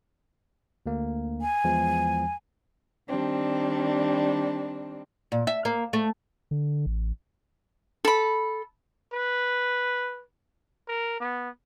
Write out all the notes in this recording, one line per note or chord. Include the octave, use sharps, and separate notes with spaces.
D2 A#3
G#5
E2 F3 G#3
D#3 G3 C4 D4
A#2
E5
A#3
A3
D3
A1
A4 B5
B4
A#4
B3